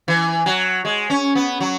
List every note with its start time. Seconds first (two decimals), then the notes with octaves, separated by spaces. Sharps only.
0.08 E3
0.46 F#3
0.85 G#3
1.10 C#4
1.35 B3
1.60 F#3